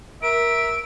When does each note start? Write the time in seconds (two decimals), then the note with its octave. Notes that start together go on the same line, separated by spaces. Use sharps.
0.22 A#4 E5 D7